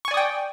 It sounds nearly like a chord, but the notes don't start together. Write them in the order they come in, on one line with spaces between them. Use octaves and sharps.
C#6 G#5 D5 D#6 G5